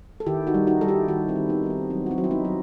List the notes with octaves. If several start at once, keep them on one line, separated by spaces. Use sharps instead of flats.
A4
D#3 E4 G4
D#4 F#4
G3
D#4 F#4
G3 A4
E4 G4
D#3 D#4 F#4
C4 E4
D#3
B3 D#4
G3 B3
C4
F#3 C4
F#4
C4 E4
F#3
E4
B3 D#4
F#3